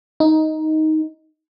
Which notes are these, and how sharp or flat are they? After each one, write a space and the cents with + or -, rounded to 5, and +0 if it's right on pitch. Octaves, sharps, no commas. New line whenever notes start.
D#4 +10